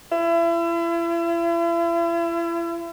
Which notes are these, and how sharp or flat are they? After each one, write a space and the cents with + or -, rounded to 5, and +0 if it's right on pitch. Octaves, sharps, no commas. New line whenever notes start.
E4 +40